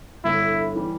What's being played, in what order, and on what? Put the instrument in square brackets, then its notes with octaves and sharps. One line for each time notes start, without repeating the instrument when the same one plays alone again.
[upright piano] G1 G2 D3 [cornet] E4
[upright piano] E3 G3